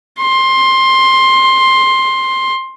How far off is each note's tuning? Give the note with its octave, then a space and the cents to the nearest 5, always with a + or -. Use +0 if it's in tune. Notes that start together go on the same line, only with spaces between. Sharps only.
C6 +15